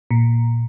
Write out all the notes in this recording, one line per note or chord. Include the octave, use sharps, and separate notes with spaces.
A#2